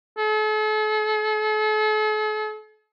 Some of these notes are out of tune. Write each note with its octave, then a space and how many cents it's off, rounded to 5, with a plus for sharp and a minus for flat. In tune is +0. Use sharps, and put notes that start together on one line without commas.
A4 -45